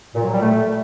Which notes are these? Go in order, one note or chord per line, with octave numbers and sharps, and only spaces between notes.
A#2
F#3
G3
A3